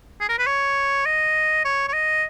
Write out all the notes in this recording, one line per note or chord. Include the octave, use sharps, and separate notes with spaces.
G#4
A#4
B4
C#5
D#5
C#5
C#5
D#5